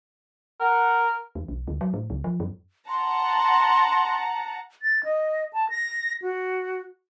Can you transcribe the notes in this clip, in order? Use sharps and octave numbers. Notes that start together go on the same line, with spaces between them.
A#4 F#5
E2
B1
D2
F#3
A2
C#2
F3
F#2
F#5 A5 A#5 C6
A6
D#5
A5
A#6
F#4